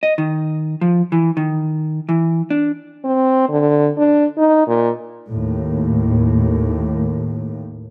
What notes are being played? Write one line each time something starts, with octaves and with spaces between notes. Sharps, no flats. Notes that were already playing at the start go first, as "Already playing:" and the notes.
D#5
D#3
F3
E3
D#3
E3
D4
C4
D3
D4
D#4
A#2
D#2 A2